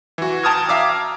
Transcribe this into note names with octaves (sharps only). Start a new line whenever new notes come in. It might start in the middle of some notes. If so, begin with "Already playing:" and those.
E3 F#4
G5 A5 A#5 D#6 F6 G#6
E5 F5 A#5 D6 E6 F6